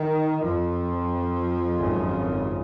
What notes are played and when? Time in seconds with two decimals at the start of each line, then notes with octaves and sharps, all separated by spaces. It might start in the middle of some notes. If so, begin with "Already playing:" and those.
Already playing: D#3
0.42 F2 F3
1.76 G#1 F#2 C#3